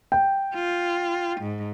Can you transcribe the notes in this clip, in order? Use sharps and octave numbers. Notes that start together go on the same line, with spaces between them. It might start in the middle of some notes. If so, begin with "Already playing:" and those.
G5
F4
G#2